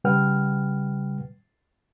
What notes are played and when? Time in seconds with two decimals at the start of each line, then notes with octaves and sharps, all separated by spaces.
0.04 C#3 G3 B4 F#5 G5 F6